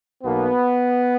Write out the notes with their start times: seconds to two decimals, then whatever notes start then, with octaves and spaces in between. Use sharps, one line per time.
0.23 B1 B2 A#3 B3